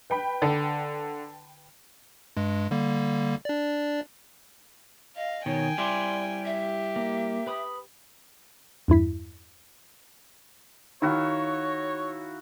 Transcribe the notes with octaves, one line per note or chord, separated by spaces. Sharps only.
B4 G5 B5
D3
G2 G#3
D3 G3 A#3
D4 D5
D#5 F5
B2 D#3 C#5 G5 G#5
G3 E4 D5 C6
G4 E5
A#3
B4 B5 D#6
E2 G2 E4 B6
D#3 E4 F#4 C#5 F5